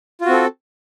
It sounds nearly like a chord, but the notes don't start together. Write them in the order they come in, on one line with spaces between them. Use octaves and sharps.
F4 F#4 C4 A4